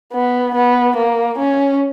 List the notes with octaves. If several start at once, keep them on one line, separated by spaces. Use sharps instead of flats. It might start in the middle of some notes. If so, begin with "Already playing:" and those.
B3
B3
A#3
C#4